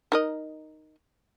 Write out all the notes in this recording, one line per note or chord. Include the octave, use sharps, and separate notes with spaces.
D#4 A#4 D#5